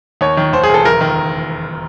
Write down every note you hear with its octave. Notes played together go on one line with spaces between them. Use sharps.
D#2 C#5
D#3
D#2 C5
G#4
E1 A4
F#1 A#4
D#3